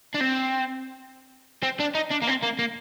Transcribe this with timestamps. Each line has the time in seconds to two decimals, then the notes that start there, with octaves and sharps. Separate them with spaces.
0.14 D4
0.20 C4
1.63 C4
1.80 D4
1.95 D#4
2.11 D4
2.22 A#3
2.27 C4
2.42 A#3
2.59 A#3